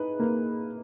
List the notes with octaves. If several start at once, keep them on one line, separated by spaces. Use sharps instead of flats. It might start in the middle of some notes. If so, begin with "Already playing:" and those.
Already playing: D#4 G#4 B4
A#3